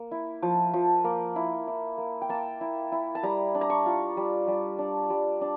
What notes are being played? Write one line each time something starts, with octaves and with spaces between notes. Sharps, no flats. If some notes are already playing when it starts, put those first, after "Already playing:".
Already playing: A#3
E4
F3
F3
A#3
E4
E4
A#3
G5
A#3 A5
E4
E4
A5
G3 A#5
D4
A#5
C#6
F4
G3
G3
D4
G3
D4